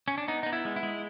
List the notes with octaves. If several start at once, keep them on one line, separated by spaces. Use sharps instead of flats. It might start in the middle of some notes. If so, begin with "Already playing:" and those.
C#4
D4
B3 D#4
B3 D#4
E4
G#3
E4
G#3